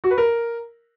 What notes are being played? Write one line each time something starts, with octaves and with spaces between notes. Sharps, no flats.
F#4
B4
A#4